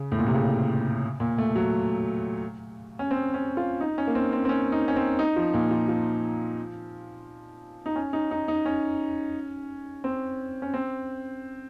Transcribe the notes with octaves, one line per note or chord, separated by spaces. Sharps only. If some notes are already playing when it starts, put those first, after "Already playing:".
Already playing: C#3
A2
A#2
C3
C#3
A#2
A3
F#3
C#4
C4
C#4
F4
D#4
C#4
A#3
C4
C4
C4
C#4
D#4
C#4
C4
D#4
F3
A#2
F3
F3
D#4
C#4
D#4
D#4
D#4
C#4
C4
C#4
C4